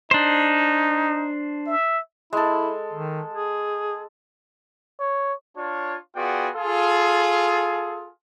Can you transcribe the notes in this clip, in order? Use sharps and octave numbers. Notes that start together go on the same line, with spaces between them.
D4 D#4 C5
E5
G#3 E4 A4
D#3
G#4
C#5
D4 F4 C#5
B3 F4 F#4 G#4 D5 G5
F4 G#4 A4